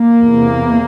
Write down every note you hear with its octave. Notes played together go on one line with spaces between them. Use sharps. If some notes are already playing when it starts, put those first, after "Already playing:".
Already playing: A#3
E2 C3